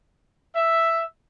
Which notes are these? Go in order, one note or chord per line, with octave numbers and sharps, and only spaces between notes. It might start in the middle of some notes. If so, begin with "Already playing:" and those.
E5